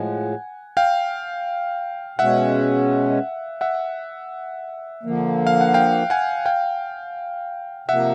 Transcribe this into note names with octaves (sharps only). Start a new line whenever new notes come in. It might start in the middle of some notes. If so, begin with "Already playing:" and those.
Already playing: A2 F3 G#3 F#5 G#5
F5 G5
B2 G#3 C#4 E5 F#5
E5 F#5
D3 F3 A#3
F5
F#5
F5 G5
F#5 G#5
F5 G5
C3 F3 A#3 E5 F#5